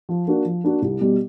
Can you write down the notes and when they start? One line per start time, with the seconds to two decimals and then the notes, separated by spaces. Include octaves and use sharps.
0.09 F3
0.27 A#3 D4 F#4
0.45 F3
0.64 A#3 D4 F#4
0.82 C2
1.01 B2 G3